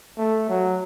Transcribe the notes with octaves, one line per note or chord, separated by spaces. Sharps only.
A3
F#3